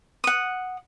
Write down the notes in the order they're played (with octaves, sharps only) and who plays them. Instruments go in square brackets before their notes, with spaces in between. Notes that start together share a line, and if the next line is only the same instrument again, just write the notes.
[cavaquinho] F#5 D#6